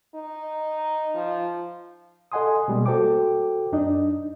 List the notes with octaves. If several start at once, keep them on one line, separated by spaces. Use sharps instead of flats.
D#4
F3
A4 D#5 F#5 G#5 C6 D#6
B2 G3 G#3 A#3
F#4 A4 C5 G5 D6
F#2 D4 D#4 D#5